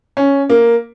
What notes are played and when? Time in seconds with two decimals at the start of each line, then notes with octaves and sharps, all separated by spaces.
0.17 C#4
0.49 A#3